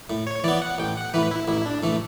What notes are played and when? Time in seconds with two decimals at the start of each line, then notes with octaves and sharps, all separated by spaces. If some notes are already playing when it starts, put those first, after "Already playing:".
0.10 A2
0.27 C#5
0.44 E3 B3 D5
0.62 F#5
0.78 A1 G5
0.96 F#5
1.14 A2 E3 B4
1.31 E4
1.48 A1 E4
1.66 D4
1.83 A2 E3 A3